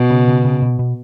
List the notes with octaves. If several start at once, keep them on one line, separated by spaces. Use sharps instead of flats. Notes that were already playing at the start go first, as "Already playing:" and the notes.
Already playing: B2
C#3
C#3
C#3
B2
B2